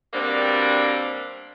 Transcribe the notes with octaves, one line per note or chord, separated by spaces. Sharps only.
B2 G3 A#3 C4 D4